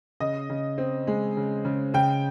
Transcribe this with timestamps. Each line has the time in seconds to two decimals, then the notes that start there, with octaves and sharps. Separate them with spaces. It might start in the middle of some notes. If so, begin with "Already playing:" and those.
0.20 C#3 D#5
0.50 C#3
0.78 C4
1.07 G#3
1.37 C#3
1.65 C#3
1.94 C#3 G5